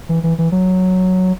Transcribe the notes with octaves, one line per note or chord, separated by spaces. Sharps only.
E3
E3
E3
F#3